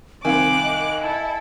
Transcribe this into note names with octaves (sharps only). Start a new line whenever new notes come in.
C2 D#3 C4 F5 G#5 D6 F#6
D#5
E4 A4